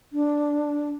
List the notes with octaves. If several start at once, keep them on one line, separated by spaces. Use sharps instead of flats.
D4